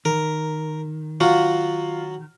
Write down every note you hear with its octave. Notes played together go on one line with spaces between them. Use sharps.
D#3 A#4
F#3 F4 F#4